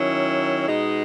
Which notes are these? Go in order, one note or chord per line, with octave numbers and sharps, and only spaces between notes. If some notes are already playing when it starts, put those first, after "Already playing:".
Already playing: D#3 F#3 C#4 E4
B2 G#3 D#4